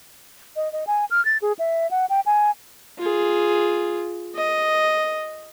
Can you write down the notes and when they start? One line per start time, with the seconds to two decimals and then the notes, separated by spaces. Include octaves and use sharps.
0.56 D#5
0.73 D#5
0.87 G#5
1.11 F6
1.25 A6
1.42 G#4
1.59 E5
1.91 F#5
2.10 G5
2.26 G#5
2.98 F4 G#4
4.35 D#5